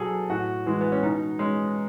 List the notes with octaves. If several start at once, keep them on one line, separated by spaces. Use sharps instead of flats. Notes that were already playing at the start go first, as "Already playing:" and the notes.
Already playing: B2 F#3 G#4 A4
A2 F#4
E3 G#3
B3
C#4
B2 D#4
G#3 C#4